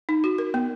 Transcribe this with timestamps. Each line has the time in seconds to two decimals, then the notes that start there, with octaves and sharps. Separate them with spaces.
0.09 D#4
0.24 F#4
0.38 A#4
0.54 B3